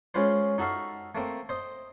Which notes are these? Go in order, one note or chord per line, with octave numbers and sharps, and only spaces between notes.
G#3 C#4 F4 B4 C5
D#4 F#4 A4 E5 F5
A3 A#3 C4
C5 D#5